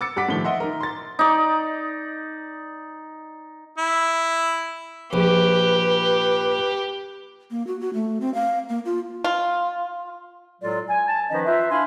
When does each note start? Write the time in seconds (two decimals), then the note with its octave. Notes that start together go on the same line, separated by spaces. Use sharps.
0.01 D6 E6 A6 C#7
0.16 G2 F#5 D6 B6 D7
0.29 A2 D#3 F3 G7
0.44 D#5 E5 F#5 C6
0.60 D#4 A#4
0.81 C6 A6
1.19 D#4 D5
3.78 E4
5.13 A#1 G4 B4
7.51 A#3
7.67 F#4
7.81 F#4
7.94 A3
8.21 C4
8.34 F5
8.69 A#3
8.85 F4
9.24 F4
10.61 A2 F#3 G#3 F4 A4 D5
10.89 G#5
11.07 A5
11.30 D#3 F3 C#4 D#4 B4 D#5
11.45 F4 B4 C5 E5
11.70 D4 E4 F5 G#5 B5 C6